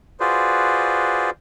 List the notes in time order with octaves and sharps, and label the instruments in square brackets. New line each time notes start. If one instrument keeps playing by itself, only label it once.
[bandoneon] F4 F#4 G#4 B4 C5 D5